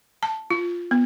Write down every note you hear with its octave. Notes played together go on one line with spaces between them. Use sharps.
A5
F4
B3